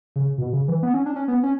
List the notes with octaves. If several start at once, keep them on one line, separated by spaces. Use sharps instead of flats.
C#3
B2
C#3
E3
B3
C#4
D4
C#4
B3
C#4